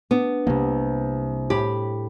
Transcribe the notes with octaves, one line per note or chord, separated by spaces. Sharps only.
B3 D4
C2 C3 A#3
A2 G4 B5 B6